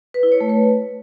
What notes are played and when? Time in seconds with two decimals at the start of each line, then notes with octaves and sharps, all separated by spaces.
0.14 B4
0.23 E4
0.32 C#5
0.41 A3
0.49 B4